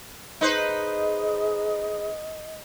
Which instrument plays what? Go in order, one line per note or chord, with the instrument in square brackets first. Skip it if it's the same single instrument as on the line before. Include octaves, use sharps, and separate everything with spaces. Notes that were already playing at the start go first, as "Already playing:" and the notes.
[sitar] D#4 B4 C5 [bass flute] G#4 [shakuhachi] D#5